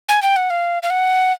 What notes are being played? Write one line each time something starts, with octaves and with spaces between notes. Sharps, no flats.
G#5
G5
F#5
F5
F5
F#5